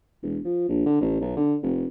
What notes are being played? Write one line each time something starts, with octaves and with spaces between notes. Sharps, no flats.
E1
F3
A#1
D3
A1
B1
D3
F1